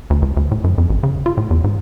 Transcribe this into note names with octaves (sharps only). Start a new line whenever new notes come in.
D2
C#2
D2
A2
F#2
F2
A1
C#3
F4
A2
E2
G#2